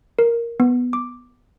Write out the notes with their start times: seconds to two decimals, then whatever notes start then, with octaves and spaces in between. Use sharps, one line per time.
0.19 A#4
0.60 B3
0.93 D6